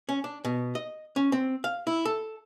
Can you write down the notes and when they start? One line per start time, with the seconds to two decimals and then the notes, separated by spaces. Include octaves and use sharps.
0.09 C#4
0.24 D4
0.45 B2
0.75 D#5
1.16 C#4
1.32 C4
1.64 F5
1.87 E4
2.05 A4